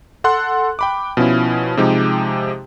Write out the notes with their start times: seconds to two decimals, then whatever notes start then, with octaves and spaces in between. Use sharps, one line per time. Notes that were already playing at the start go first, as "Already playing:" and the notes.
0.24 A4 F#5 C6 F#6
0.79 G5 B5 D6
1.17 B2 F3 C#4 E4
1.77 C3 F3 G#3 D#4 G4